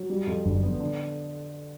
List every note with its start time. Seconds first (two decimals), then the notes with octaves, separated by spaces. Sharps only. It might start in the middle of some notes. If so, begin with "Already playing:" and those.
Already playing: F#3
0.10 G3
0.27 F2
0.45 F#1 F#2 D3
0.63 B3
0.80 D3